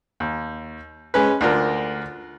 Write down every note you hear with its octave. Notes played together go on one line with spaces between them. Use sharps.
D#2
G#3 C#4 B4
D2 D4 F4 A#4